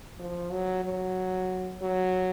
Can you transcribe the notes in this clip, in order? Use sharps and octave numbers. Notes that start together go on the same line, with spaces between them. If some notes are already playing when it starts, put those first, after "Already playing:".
F3
F#3
F#3
F#3